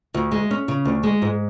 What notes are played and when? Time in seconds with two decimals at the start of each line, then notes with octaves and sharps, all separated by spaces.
0.14 D2
0.32 G#3
0.51 C#4
0.68 C#3
0.85 D2
1.03 G#3
1.22 G#2